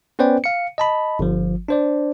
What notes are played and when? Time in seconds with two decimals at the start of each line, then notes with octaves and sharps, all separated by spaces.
0.19 B3 C#4 B4 C5 D5 G5
0.44 F5 C#7
0.78 D#5 A5 B5
1.19 G1 F3
1.68 D4 C5 D5